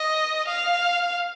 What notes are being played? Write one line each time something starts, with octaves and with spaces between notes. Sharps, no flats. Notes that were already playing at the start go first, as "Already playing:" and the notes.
Already playing: D#5
F5